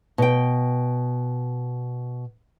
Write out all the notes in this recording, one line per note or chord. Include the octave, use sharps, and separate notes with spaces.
B2 G5